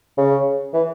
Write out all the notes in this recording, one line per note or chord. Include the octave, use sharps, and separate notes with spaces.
C#3
E3